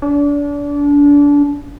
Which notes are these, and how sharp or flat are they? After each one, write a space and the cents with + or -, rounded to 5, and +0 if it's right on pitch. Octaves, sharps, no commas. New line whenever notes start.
D4 -30